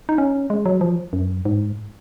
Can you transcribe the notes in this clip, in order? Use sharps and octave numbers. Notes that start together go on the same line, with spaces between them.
D#4
C#4
G#3
F#3
F3
F#2
G#2